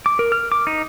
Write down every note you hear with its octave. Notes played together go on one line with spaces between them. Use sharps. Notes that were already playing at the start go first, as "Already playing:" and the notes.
D6
A#4
F6
D6
D#4